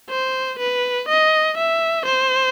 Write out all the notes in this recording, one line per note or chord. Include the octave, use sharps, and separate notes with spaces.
C5
B4
D#5
E5
C5